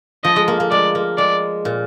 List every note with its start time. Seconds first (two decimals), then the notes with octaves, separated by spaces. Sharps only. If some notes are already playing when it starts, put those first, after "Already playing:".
0.24 F3 D#5
0.36 G#3
0.48 A#3
0.60 A#3
0.71 G#3 D5
0.95 A#3
1.18 G#3 D5
1.65 A#2